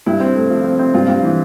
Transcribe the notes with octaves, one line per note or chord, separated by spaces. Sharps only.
G2 E4
C4
A3
F3
C4
C4
G2 F4
G2
E3